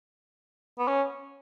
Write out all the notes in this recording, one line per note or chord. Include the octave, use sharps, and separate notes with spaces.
B3
C#4